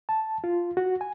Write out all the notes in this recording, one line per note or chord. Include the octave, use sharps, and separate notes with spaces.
A5
F4
F#4
G#5